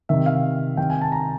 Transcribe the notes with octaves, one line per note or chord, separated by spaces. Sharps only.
C3 D#3 E5
F5
C3 D#3 G5
G#5
A5
A#5